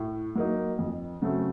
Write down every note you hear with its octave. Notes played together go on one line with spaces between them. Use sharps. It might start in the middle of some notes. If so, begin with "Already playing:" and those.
Already playing: A2
F#3 A#3 D#4
F2
C#3 F#3 A3 C4